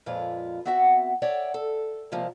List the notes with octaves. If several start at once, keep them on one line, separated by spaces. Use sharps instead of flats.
F2 A#2 G#3 F4 B4
B3 C4 F#4 E5 F#5
A4 C#5 D5 E5 F#5 G5
A4
C3 F3 G3 G#3 A#3